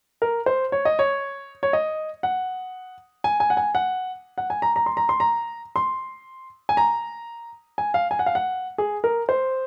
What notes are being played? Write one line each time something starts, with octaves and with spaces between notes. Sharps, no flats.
A#4
C5
C#5
D#5
C#5
C#5
D#5
F#5
G#5
G#5
F#5
G#5
F#5
F#5
G#5
A#5
A#5
C6
A#5
C6
A#5
C6
G#5
A#5
G#5
F5
G#5
F#5
F5
F#5
G#4
A#4
C5